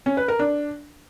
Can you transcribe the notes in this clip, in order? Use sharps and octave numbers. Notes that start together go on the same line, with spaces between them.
C#4
B4
A#4
D4